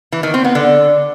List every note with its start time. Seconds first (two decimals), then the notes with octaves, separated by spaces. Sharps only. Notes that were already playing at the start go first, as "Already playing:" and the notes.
0.12 E3
0.23 D#3
0.34 C4
0.44 B3
0.55 D3